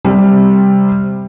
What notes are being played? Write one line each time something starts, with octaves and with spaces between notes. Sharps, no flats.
C3 G3